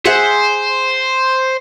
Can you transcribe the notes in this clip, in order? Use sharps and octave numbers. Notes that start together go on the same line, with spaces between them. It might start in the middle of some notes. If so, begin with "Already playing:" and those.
G#4 C5 E5 F#5